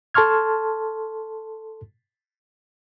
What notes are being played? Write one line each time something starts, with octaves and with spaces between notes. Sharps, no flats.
A4 A5 C6 C#6 F6 G#6